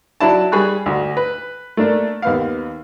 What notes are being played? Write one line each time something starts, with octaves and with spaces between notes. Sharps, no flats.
F#3 D4 E4 A5
G3 G#4 B5 C#6 F#6
D2 F#4
B4
A3 A#3 D4
D#2 B3 F5